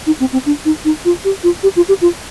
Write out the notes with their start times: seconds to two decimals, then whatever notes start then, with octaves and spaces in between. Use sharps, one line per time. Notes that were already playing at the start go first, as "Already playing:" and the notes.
0.07 D#4
0.20 C4
0.33 C4
0.46 D4
0.65 D#4
0.85 D#4
1.05 F4
1.25 G4
1.44 F4
1.63 G4
1.76 F4
1.89 G4
2.02 F4